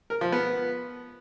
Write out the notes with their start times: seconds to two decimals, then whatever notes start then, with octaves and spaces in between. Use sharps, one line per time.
0.10 A#4
0.21 F3
0.32 B3